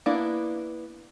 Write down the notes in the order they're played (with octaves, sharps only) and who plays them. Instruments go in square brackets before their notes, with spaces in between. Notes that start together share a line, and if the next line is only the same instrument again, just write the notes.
[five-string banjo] A#3 B3 D4 E4